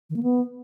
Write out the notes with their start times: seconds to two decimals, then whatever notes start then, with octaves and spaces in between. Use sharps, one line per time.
0.10 D#3
0.16 A#3
0.23 B3